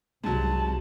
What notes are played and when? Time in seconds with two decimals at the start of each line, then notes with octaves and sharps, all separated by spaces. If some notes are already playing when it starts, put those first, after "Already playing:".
0.24 C2 G#2 F#3 A5